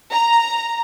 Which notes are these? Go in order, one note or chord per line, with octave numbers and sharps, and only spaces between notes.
A#5